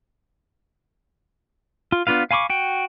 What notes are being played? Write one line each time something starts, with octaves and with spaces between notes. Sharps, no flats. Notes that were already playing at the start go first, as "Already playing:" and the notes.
F4
B3 D4 F4 B4 F5
F5 G#5 B5 C#6 D6
F#4 G5